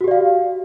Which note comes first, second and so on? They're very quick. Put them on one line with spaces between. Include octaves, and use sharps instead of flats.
F#4 G4 D5 F5